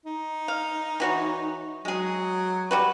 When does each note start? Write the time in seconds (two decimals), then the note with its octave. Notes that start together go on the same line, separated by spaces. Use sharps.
0.06 D#4
0.48 F5
1.00 E3 F#4 C#5
1.85 F#3 G#3 G#4
2.71 G3 F#4 B4